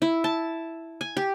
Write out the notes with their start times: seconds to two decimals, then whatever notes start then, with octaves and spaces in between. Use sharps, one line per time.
0.02 E4
0.24 A5
1.01 G#5
1.17 G4